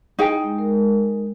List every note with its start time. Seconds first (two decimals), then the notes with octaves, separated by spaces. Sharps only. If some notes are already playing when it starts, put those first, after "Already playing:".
0.19 D#4 E4 G#4 G5
0.43 G#3
0.58 G#3 A#4